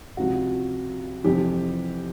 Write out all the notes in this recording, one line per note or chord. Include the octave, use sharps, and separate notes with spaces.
C#2 C3 F3 F#4
F2 C3 E3 G4